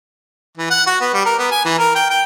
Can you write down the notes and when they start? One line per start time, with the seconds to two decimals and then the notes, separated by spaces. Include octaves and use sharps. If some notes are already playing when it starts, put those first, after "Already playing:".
0.57 E3
0.70 F#5
0.86 F#4
1.01 B3
1.13 G3
1.25 A#4
1.38 B3
1.51 G#5
1.65 E3
1.79 A#4
1.95 G5
2.10 G5